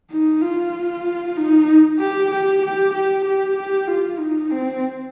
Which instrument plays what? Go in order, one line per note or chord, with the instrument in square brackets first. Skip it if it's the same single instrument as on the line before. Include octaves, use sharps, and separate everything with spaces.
[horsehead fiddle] D#4
F4
D#4
G4
G4
G4
G4
G4
G4
F4
D#4
C4